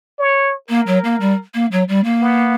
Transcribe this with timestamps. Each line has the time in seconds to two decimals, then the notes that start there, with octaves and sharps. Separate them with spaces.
0.19 C#5
0.69 A#3 A#4
0.87 F#3
1.04 A#3
1.20 G3
1.54 A#3
1.72 F#3
1.88 G3
2.04 A#3
2.22 B3